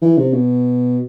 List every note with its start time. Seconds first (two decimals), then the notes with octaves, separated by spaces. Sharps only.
0.02 E3
0.18 C3
0.33 B2